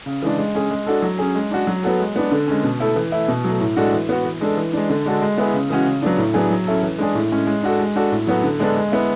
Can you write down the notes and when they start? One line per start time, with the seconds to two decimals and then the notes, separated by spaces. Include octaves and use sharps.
0.06 C#3
0.22 E3 G#3 D4
0.38 G#3
0.55 C#4 G#4
0.71 G#3
0.87 D4 F#4 A4
1.02 F#3
1.19 C#4 G#4
1.35 G#3
1.51 D4 F#4
1.67 F#3
1.83 B3 F#4 A4
2.00 G#3
2.16 B3 D4
2.32 D3
2.48 G#3 C#4
2.64 B2
2.80 A3 E4 A4
2.96 E3
3.12 A3 E4
3.28 B2
3.45 F#3 A3
3.61 A2
3.77 G#3 D4 F#4 A4
3.92 E3
4.09 B3 F#4
4.25 E3
4.41 G#3 D4 A4
4.57 E3
4.73 G#3 D4
4.90 D3
5.06 G#3 D4 F#4 A4
5.22 G#3
5.38 B3 E4 G#4
5.54 C#3
5.70 E3 G#3 C#4 F#4
5.86 C#3
6.02 F#3 B3 D4
6.18 A2
6.34 F#3 B3 D4 G#4
6.50 F#3
6.67 C#4 E4 A4
6.83 E3
6.98 G#3 D4 G#4
7.15 A2
7.31 G#3 C#4
7.47 G#3
7.63 D4 F#4 A4
7.79 G#3
7.96 D4 F#4 A4
8.12 A2
8.27 F#3 B3 F#4 A4
8.43 D3
8.60 G#3 B3 D4 A4
8.76 G#3
8.92 B3 E4